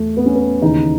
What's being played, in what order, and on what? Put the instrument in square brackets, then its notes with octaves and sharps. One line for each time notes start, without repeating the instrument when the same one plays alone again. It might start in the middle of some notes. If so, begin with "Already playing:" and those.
Already playing: [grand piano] E2 A3
B3
C#4
B3
D#2 C#3 E3 D#4